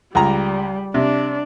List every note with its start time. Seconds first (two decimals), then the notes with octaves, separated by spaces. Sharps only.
0.15 C#2 G3 A#5
0.94 C3 D4